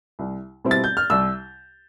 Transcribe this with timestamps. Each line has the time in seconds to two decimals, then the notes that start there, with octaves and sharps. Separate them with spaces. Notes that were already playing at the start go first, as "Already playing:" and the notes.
0.19 C2
0.65 B2 G3 C4 E4
0.71 A6
0.84 G6
0.97 F6
1.10 C2 E6